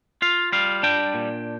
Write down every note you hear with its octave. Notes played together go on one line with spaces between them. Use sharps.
F4 F5
G3 F5
D4 G5
A#2